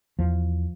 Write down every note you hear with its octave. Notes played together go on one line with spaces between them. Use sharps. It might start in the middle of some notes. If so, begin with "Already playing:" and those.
E2 F3